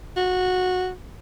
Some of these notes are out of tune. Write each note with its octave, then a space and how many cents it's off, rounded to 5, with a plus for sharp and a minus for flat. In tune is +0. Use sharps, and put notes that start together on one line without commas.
F#4 -15